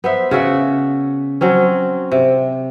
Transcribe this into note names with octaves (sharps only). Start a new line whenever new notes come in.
B3 C5 E5
C#3 F#4 E5 F#5
F#3 C4 C#4
C3